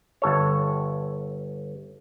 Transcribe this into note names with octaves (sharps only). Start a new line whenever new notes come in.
G1 A4 C#5